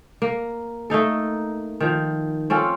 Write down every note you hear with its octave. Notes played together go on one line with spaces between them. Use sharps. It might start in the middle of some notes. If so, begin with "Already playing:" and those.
A#3
A3 A#3 D#4 A4
D#3 F3
C4 C#4 F4 A4